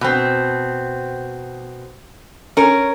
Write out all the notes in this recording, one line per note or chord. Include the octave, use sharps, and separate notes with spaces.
B2 C4
C#4 A#4